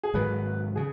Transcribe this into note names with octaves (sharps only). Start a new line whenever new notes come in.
G#4
G#2 D#3 F#3 B4
C#3 G#4